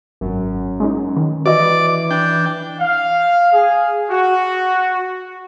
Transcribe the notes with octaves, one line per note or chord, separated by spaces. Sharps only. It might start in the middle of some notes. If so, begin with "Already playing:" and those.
G#1 F#2
G#3 C#4 D#4
D#3
E3 F#4 D5 D#5 D6
D4 G5
F5
G#4
F#4